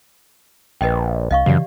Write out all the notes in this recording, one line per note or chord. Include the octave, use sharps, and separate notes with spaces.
A#1 B4 D#5 G5
C2 D#5 F5 C#6
F#2 C#3 E3 G4 D5